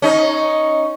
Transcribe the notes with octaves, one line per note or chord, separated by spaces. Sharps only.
C#4 D#4